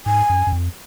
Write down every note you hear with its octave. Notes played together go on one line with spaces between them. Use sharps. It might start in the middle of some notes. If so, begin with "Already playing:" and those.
G#2 G#5
F#2
F#2
F2